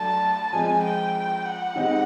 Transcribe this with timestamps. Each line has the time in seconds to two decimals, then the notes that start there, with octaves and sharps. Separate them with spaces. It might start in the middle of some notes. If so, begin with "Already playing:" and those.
Already playing: F#3 A3 D4 A5
0.53 F3 G#3 C4 G#5
0.84 G5
1.45 F#5
1.75 D#3 G#3 C4 D#4 G4